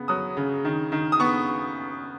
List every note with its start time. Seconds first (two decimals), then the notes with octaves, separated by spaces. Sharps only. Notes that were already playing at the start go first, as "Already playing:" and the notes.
Already playing: C#3 B3
0.08 F#3 D#6
0.37 C#3
0.65 D#3
0.92 D#3
1.12 D#6
1.20 B3 C#6